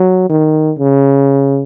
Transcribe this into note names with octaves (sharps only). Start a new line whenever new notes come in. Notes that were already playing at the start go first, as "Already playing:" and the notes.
Already playing: F#3
D#3
C#3